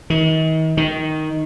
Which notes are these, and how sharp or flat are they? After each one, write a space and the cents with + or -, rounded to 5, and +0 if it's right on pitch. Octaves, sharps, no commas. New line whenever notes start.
D#3 +40
D#3 +5